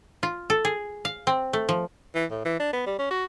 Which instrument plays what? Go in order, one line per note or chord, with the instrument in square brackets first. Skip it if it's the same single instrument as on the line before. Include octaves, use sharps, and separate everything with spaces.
[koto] F4
A4
G#4
F5
C4
A3
F3
[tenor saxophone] E3
A2
E3
D4
B3
G3
C#4
F#4